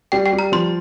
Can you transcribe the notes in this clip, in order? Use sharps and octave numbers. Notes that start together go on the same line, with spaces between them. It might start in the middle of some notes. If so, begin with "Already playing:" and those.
G3 G5
G5
G3
A#5
F3 C6